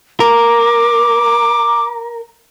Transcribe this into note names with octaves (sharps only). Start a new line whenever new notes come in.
A#4 D6